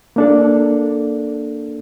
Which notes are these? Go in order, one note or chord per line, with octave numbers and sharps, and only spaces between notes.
A#3 D4 A4